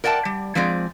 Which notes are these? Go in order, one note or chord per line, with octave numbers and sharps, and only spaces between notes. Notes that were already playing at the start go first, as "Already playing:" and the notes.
A#4 D5 F#5 G5 A5
G3
F3 G#3 C4 G#4 D5